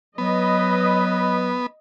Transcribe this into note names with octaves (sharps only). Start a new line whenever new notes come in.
F#3 B3 B4 D#5